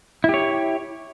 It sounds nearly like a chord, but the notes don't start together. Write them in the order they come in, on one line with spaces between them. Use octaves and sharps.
E4 G4 C#5